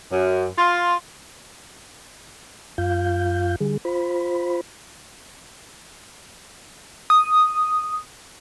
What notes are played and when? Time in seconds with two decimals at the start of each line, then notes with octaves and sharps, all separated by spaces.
0.11 F#2
0.57 F4
2.78 F#2 F4 F5 G6
3.60 D3 G3 G#4
3.85 F4 C5 B5
7.10 D#6